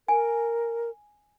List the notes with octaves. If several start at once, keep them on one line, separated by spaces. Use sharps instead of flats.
A#4 G#5